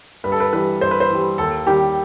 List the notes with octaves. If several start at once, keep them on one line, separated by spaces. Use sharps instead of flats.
G2 B4
A4
B4
E3 G3 B4
G2 C5
B4
C5
E3 G3
D#2 A4
D#3 G3 G4